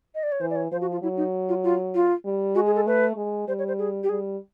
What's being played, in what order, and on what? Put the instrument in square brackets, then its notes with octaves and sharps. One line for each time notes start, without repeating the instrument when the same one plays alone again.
[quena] D#5
D5
C#5
[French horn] E3 [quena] C5
[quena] D5
C#5
[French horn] F3 [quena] C5
[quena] F#4
F4
[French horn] F#3 [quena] E4
[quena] D#4
F4
F4
F4
[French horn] G3
[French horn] G#3 [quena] F#4
[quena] G#4
A4
[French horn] A3 [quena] B4
[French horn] G#3
[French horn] G3 [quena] C5
[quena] C#5
C5
G#4
G4
[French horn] G3 [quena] G#4